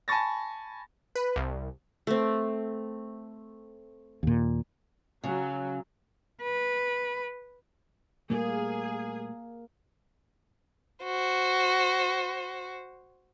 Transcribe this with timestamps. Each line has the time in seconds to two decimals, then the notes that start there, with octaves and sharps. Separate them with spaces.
0.08 G#5 A5 B5 C#6 A6 A#6
1.15 B4
1.36 C2
2.07 A3 C4
4.23 D#2 A#2
5.24 C#3 F#3
6.43 B4
8.30 A#2 G3 A3 A#3 G#4
11.04 F#4 C5